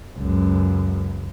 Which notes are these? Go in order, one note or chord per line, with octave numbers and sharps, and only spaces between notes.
C#2 F#2